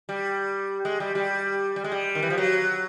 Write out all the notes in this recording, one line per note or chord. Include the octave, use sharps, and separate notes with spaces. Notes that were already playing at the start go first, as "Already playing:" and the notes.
G3
G#3
G3
G3
G3
G#3
G3
D#3
E3
F3
F#3